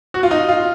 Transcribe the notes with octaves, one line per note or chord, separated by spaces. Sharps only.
F#4
F4
D#4
F4